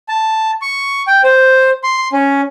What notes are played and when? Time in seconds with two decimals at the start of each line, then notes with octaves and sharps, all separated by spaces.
0.09 A5
0.62 C#6
1.07 G5
1.24 C5
1.84 C6
2.13 C#4